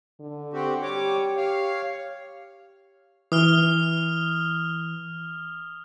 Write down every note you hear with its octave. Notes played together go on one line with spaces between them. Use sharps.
D3
C4 F#4 G4
G3 G4 C#5 D6
C#5 F5
E3 D#6 F6 G7